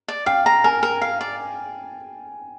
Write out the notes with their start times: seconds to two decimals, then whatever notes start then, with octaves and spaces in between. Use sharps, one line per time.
0.08 D5
0.26 F5 G5
0.46 A#5
0.64 A#4 G#5
0.83 A#4
1.01 F5
1.21 D5